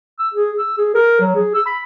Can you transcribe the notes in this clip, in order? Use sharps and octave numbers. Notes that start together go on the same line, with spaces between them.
E6
G#4
E6
G#4
A#4
F#3
G#4
E6
B5